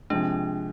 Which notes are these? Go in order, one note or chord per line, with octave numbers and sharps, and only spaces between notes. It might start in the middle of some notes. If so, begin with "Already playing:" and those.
C3 F3 G#3 D4